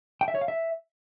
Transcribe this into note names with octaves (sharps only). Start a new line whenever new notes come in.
G5
E5
C#5
F5
E5